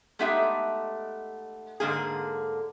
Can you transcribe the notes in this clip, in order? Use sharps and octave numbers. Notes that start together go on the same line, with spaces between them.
G#3 A3 B3 D#4 G4 E5
G#2 D3 A#3 G#4